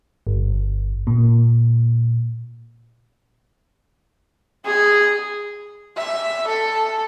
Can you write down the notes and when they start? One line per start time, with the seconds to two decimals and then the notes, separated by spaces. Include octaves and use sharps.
0.27 G1
1.07 A#2
4.66 G#4
5.97 E5
6.47 A4